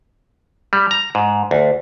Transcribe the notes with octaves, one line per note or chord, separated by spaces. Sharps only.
G3
A#5
G#2
D2